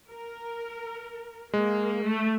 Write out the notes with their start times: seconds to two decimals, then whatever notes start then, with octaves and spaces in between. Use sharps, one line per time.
0.10 A#4
1.54 G#3 A#3
2.04 A3